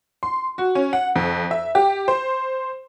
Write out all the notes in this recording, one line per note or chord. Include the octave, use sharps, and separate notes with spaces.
C6
F#4
C#4
F#5
F2
E5
G4
C5